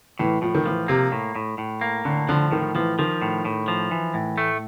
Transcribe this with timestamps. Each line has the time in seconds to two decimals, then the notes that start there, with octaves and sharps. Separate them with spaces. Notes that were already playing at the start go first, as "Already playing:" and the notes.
0.19 A2 E3
0.42 A2 F3
0.55 D#3
0.66 E3 F3
0.88 C3 A#3
1.12 A2
1.36 A2
1.58 A2
1.81 A#3
2.05 A2 D3
2.29 D3 F3
2.52 A2 D#3
2.75 E3 F3
2.99 D#3 F3
3.22 A2
3.45 A2
3.68 F3
3.91 E3
4.14 A2
4.38 A3